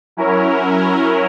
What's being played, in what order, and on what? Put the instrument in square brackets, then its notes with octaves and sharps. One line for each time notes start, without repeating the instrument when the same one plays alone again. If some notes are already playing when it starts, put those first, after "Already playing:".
[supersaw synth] F#3 C#4 E4 A#4